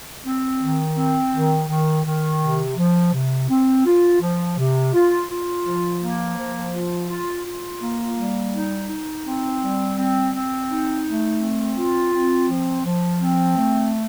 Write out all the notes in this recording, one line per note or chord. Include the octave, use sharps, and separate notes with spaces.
C4
D#3
C4
D#3
D#3
D#3
C3
F3
C3
C4
F4
F3
C3
F4
F4
F3
A#3
F3
F4
F4
F4
A#3
G3
D#4
D#4
C4
G3
C4
C4
D#4
A3
C4
F4
C4
F3
F3
C4
A3